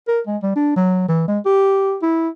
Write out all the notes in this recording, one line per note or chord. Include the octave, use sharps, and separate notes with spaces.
A#4
G#3
G3
D4
F#3
E3
G#3
G4
E4